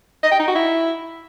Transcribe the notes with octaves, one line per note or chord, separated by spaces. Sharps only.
D#5
G5
D#4
F#4
E4